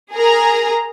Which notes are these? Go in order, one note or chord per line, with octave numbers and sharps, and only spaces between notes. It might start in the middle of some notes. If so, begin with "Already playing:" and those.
G#4 A#4 A#5